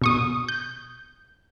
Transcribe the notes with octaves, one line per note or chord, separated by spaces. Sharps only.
B2 C#6 D#6
G6